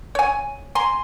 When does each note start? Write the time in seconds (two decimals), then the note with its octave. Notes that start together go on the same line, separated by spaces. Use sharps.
0.15 C#5 G#5
0.75 G#5 A#5 C6